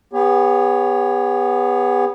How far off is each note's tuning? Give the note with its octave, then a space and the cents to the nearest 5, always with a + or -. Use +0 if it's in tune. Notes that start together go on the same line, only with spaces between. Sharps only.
B3 +0 G4 +45 C#5 +5